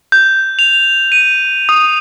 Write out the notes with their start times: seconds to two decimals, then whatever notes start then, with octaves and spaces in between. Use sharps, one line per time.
0.12 G6
0.59 F7
1.12 D#7
1.69 D#6